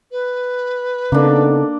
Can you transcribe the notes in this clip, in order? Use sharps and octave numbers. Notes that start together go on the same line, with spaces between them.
B4
C#3 A#3 B3 D4 D#4 A4